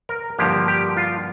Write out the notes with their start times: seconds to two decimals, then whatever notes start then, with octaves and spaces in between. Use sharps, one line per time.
0.09 A#4
0.38 G2 D3 F3 A#3 G4
0.68 G4
0.97 F4